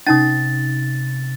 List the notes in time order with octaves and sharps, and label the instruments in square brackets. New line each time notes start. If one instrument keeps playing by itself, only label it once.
[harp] C3 C7 [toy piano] C#4 D#4 D#6 [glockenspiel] A6